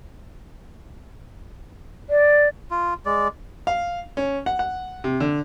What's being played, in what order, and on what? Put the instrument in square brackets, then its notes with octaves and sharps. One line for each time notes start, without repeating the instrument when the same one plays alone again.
[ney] D5
[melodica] F4
G#3 D5
[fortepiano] F5
C#4
F#5
F#5
C3
D3